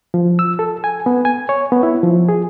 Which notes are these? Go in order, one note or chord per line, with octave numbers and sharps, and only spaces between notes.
F3
E6
A4
G#5
B3
G#5
C#5
B3
E4
F3
G#4